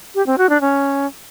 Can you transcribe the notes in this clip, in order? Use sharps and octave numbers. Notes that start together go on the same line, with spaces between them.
G4
C4
F#4
D4
C#4